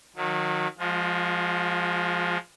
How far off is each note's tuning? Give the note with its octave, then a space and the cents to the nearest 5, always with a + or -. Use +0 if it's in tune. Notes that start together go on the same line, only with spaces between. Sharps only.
D#3 -10 F#3 -30
F3 +0 G#3 -5 F4 +45